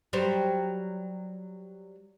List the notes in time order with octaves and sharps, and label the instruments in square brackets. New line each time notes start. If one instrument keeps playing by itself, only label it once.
[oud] F#3 G3 C5